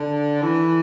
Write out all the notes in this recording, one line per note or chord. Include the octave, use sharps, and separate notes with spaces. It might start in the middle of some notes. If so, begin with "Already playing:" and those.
Already playing: D3
E3